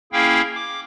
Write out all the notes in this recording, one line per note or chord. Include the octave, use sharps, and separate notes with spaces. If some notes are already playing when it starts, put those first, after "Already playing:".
A#3 C#4 E4 G#4 F5 G5
D6